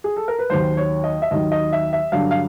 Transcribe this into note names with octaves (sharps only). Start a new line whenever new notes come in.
G#4
A4
A#4
B4
D#2 D#3 F#3 C5
C#5
D#5
E5
D#2 D#3 F#3 D#5
D#5
E5
E5
G2 D3 F#3 F5
F5